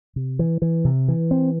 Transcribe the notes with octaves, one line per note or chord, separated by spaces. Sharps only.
C3
E3
E3
C3
E3
C4